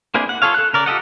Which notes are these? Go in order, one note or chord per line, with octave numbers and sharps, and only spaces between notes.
A#3 C4 D4 E4 G#4
F#5
F4 G#4 A4 C#5 F5
A4 F#6
C#3 A#4 D5
F4 G4 A4 D#5 F#5